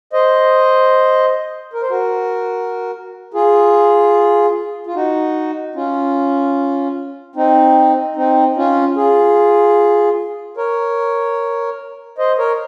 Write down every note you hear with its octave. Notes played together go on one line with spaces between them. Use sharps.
C5 D#5
A#4
C5
F#4 A#4
F4 G#4
F4
D#4 F#4
C#4 F4
C4 D#4
C4 D#4
C#4 F4
F4 G#4
A#4 C#5
C5 D#5
A#4 C#5